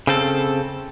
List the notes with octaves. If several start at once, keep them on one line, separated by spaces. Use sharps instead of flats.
C#3 C4 A4